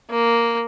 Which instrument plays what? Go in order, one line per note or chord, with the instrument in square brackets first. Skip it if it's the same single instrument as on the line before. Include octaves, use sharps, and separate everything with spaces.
[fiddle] A#3